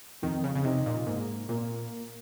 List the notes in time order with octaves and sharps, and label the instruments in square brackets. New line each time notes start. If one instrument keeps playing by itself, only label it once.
[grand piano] F2 [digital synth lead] D#3
[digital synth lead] C#3
C#3
[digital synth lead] C3 [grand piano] D#4
[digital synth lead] A#2
[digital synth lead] G#2 [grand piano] A#3
[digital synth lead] A#2 [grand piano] A#3